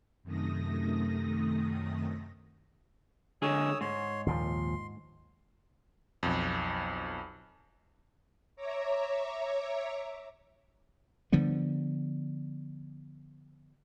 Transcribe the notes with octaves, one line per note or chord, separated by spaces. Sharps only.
F#2 C3 D#3 A3 D#6 A#6
D3 G#3 G#4 C#5 D#6 E6
G#2 C#5 C6
D#2 A#2 F3 C6
B1 F2
C#5 E5 A#5 D6
D3 F3 G3 B3